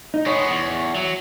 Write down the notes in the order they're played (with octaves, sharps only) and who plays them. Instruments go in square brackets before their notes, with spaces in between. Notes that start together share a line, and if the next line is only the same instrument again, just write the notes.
[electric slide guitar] D#4
[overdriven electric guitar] G#3 B3 [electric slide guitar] C#5
[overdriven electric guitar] E2
F#3